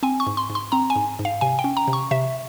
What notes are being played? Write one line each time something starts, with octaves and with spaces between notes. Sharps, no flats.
C4 G#5
C#6
G#2
C6
G#2
C6
C4 A#5
G#5
G#2
G#2
F5
C3 G#5
G5
C#4
A#5
C3
C#6
C3 E5